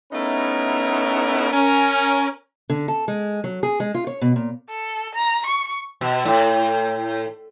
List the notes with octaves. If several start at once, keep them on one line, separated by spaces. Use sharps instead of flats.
A3 B3 C#4 D#4 E4 A#4
C#4 A#4
D3
A4
G#3
F#3
G#4
G#3
F4
C#5
B2
A#2
A4
A#5
C#6
B2
A2